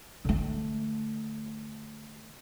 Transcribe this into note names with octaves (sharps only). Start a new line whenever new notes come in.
D3 A3